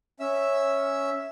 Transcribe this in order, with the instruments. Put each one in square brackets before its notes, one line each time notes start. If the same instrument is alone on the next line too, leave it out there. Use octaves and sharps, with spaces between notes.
[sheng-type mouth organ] C#4 E5 E6